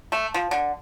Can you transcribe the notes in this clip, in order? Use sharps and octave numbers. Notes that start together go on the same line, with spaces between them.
A3
F3
D3